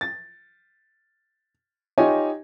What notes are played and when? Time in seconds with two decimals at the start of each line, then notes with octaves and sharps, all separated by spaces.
0.01 A6
1.98 D#4 F4 G4 C#5 D#5 G#5